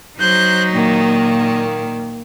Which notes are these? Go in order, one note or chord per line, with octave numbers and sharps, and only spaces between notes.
F#3 D#4 C5 F#6 G6
A#2 D#3 A#3